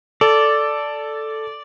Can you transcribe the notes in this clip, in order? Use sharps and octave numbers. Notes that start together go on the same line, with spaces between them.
A4 D5